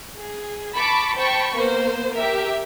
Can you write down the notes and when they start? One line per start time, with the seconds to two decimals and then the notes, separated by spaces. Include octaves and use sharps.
0.15 G#4
0.76 A5 B5 C#6 D6
1.17 C5 G5 A5 B5 C#6
1.56 A#3 B3 C5
2.16 G4 A#4 E5